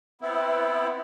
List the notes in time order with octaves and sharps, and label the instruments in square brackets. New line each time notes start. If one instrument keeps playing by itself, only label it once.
[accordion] B3 C4 E4